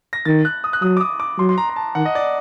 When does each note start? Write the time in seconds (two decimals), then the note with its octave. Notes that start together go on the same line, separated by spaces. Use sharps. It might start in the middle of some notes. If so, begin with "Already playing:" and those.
0.13 A#6
0.25 D#3 A6
0.45 F#6
0.64 D#6
0.73 F#6
0.82 F#3 D#6
0.97 D6
1.01 D#6
1.20 D6
1.38 F#3 C6
1.49 C6
1.58 A#5
1.69 A#5
1.76 A5
1.95 D#3 F#5
2.05 D#5
2.15 D5